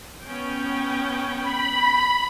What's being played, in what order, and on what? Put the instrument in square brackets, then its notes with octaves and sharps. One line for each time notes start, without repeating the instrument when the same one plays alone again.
[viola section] B3 C#4 G5
[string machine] B5